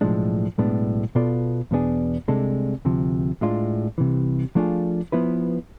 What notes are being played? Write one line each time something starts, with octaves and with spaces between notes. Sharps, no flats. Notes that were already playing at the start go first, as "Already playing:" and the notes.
B1 A2 F3 G#3 D4
B1 A2 G#3 B3 D4
B2 B3 F4 A4 D5
E2 B2 B3 D4 G#4
C2 C3 G#3 D4 A4
D2 C3 F3
A2 G#3 D4 F4
C2 C3 E3
F3 A3 D4 F4 G#4
F3 B3 E4 B4